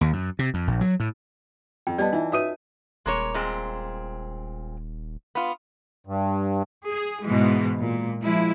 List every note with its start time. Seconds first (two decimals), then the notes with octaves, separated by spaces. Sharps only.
0.01 D#2
0.13 F#2
0.39 C3
0.54 F2
0.67 A#1
0.81 F#3
1.00 A2
1.87 F2 G5
1.98 G3 B3 D5 D#5 A5
2.13 E3 D#4 F4 E5
2.32 F#4 B4 C#5 E5 D#6 D#7
3.06 D#1 G#3 A#3 C#5
3.34 A#2 G#3 C4
5.35 B3 F4
6.07 G2
6.90 G#4
7.26 G#2 B2 E3 G#3
7.80 A#2
8.23 F3 G#3 E4